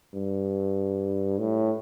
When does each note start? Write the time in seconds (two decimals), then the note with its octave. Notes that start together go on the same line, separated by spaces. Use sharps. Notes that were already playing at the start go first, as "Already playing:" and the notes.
0.14 G2
1.39 A2